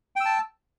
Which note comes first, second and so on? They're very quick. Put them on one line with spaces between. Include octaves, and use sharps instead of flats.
G5 E6 A5